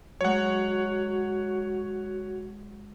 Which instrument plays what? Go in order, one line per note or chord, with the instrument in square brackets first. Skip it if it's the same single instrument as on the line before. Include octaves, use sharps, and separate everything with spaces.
[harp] F#3 G#3 [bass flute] F#4 [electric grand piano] C#5 F#5